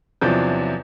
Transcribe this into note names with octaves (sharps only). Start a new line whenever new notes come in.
E2 C3 F3 F#3 D4 G6